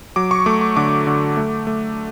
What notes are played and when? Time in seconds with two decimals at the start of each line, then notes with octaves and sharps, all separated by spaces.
0.16 F#3 D6
0.31 C#6
0.46 A3 D6
0.61 C#6
0.76 D3 D6
1.07 D3
1.37 A3
1.67 A3